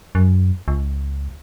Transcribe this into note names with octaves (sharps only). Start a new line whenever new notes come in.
F#2
C#2